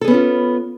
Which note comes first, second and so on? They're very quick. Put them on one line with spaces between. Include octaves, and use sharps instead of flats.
A4 G#4 B3 C#4 F4